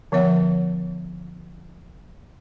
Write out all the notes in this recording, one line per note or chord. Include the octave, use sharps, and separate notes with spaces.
D3 F3 B3 C#5 E5 F#5